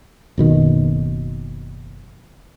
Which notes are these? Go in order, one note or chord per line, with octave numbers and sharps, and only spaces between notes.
F#1 B2 D#3